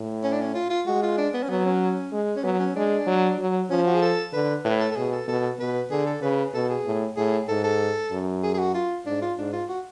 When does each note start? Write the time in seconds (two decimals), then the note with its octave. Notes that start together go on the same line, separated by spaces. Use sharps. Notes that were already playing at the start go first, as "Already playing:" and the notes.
Already playing: A2
0.24 C#4
0.32 D4
0.41 C#4
0.54 F4
0.70 F4
0.86 G#3 F#4
1.02 F4
1.18 D4
1.34 B3
1.43 C#4
1.49 F#3 B3
1.65 C#4
2.12 G#3
2.36 C#4
2.44 F#3 B3
2.59 C#4
2.75 G#3 D4
3.07 F#3
3.39 F#3
3.70 F3 C#4
3.86 F#4
3.94 G#4
4.02 A4
4.32 D3 B4
4.64 A2 B4
4.80 A4
4.91 A4
4.96 B2 G#4
5.12 A4
5.28 B2 A4
5.59 B2 B4
5.91 D3 G#4
6.06 A4
6.22 C#3 B4
6.54 B2 A4
6.70 G#4
6.86 A2
7.17 A2 G#4
7.48 G#2 A4
7.64 A4
8.11 F#2
8.43 G#4
8.54 G#4
8.58 F#4
8.75 F4
9.05 G#2 D4
9.22 F4
9.38 G#2 D4
9.53 F4
9.69 F#4